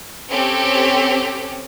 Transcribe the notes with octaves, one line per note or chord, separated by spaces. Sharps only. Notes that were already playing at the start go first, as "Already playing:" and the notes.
C4 C#4 G4 A4